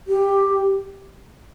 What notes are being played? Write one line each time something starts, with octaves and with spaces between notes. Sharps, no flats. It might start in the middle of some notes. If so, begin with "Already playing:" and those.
G4